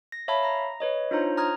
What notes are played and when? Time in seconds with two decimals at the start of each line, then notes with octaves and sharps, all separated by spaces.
0.12 A#6
0.28 C#5 E5 F5 A5 B5
0.43 A#5 A#6
0.80 B4 C#5 D#5
1.11 D4 D#4 F4 C5 C#5 A#5
1.37 A#5 D#6 F6 G#6